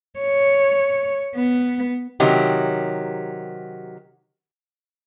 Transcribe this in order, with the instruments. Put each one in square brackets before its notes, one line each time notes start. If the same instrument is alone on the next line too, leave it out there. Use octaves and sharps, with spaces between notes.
[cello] C#5
B3
[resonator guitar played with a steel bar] C3 D#3 F#3 G4